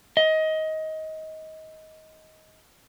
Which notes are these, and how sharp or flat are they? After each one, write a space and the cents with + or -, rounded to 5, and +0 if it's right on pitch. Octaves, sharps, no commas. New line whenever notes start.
D#5 +20